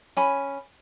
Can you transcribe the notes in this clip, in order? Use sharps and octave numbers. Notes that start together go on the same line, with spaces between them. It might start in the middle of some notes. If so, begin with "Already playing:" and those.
C#4 G#5 B5